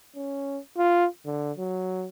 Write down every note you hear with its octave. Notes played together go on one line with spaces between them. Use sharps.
C#4
F4
D3
F#3